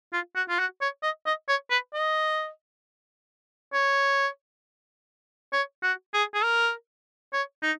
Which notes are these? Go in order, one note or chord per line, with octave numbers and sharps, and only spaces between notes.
F4
F#4
F4
F#4
C#5
D#5
D#5
C#5
B4
D#5
C#5
C#5
F#4
G#4
G#4
A#4
C#5
D#4